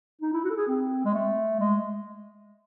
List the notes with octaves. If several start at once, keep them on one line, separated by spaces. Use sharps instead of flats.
D#4
E4
F#4
A4
G#4
C4
G#3
A3
G#3